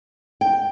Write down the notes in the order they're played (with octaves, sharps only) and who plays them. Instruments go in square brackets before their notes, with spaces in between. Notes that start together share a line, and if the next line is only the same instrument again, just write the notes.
[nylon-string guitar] G5